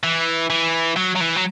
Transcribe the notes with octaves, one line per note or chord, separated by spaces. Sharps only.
E3
E3
F#3
F#3
E3
F#3